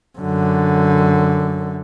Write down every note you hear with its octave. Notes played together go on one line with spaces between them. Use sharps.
F#2 D3